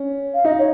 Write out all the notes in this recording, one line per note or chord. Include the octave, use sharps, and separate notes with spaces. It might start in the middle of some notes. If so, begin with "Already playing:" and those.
Already playing: C#4
F5
D#4 D#5
C#5